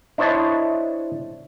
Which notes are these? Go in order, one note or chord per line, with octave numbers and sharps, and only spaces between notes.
D4 E4 C5 C#5 D#5 A5